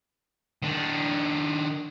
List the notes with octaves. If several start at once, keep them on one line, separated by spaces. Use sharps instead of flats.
D#3 D4